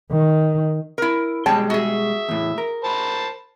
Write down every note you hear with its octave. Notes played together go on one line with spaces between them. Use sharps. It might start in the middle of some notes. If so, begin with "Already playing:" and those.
D#3
E4 A#4
B2 G3 G#3 C#5 G5 A5
F#4 G#4 E5
E2 A2
A#4
C5 A5 B5